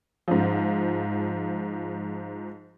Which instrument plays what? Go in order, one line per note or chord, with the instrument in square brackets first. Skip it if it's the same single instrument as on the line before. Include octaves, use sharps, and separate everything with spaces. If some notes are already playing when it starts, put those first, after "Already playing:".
[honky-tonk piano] G#2 F3